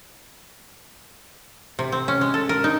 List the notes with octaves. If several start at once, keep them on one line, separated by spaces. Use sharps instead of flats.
C3
C4
C#4
G#3
A4
A#4
D#4